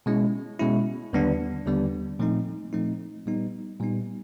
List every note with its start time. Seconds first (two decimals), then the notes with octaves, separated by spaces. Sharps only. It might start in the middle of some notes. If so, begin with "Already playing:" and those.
0.06 B2 G#3 C#4 E4
0.59 B2 G#3 C#4 E4
1.13 D#2 D3 G3 B3 D4
1.66 D#2 D3 G3 B3 D4
2.19 A#2 F3 A3 C4 D#4
2.73 A#2 F3 A3 C4 D#4
3.26 A#2 G3 B3 D#4
3.80 A#2 G3 B3 D#4